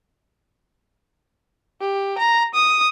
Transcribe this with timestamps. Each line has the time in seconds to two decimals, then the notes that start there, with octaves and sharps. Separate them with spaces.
1.81 G4
2.18 A#5
2.54 D#6